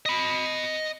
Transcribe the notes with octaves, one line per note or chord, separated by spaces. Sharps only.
D#5 B5